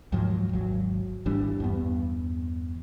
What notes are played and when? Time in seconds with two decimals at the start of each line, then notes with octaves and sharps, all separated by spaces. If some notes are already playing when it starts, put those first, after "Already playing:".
0.12 D#2 G#2 F3 F#3
0.53 G#1 F#3
1.26 G#1 E3 G3 D4
1.60 E2 G2 B3